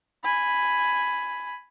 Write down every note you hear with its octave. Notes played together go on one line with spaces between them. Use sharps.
G#5 B5